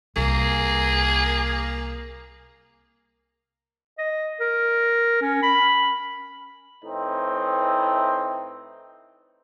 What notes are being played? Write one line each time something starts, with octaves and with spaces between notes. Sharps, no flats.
C2 A#3 G#4
D#5
A#4
C#4
B5
A2 E3 C4 D#4